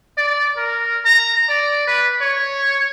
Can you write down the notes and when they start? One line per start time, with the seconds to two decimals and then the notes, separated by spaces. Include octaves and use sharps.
0.18 D5
0.57 A#4
1.05 A#5
1.49 D5
1.87 B4
2.21 C#5